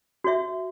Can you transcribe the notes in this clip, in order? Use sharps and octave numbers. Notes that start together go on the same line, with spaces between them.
F#4 C#5 E5